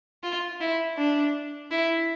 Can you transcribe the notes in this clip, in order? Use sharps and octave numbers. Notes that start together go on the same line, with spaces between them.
F4
E4
D4
E4